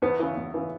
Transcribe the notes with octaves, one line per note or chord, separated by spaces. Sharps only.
E2 B3
C#3 E3
E2
C#3 E3